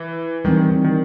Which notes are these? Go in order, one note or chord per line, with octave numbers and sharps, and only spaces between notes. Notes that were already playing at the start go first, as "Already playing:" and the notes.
Already playing: E3
D#3 E3 G3 C4
D#3
D#3
D#3